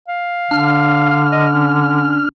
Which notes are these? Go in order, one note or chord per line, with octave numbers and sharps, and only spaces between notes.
F5
D3 D4 F6
D#5
C#4